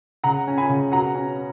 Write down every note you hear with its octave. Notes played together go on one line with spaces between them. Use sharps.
C#3 F#5 A#5
C#4
G#5 B5
C#3
B2 F#5 A#5
C#4